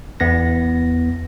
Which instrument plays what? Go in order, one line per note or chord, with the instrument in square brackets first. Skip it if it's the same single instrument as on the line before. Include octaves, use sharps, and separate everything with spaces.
[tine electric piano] E2 B3 A#6